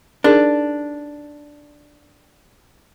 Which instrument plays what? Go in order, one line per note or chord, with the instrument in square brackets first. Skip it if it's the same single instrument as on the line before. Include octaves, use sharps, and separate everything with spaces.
[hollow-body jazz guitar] D4 [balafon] D#4 G#4 A#4